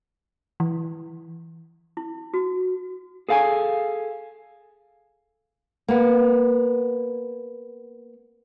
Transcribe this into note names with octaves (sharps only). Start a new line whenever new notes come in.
E3
E4
F#4
G#4 A4 F5 F#5 G#5
A#3 B3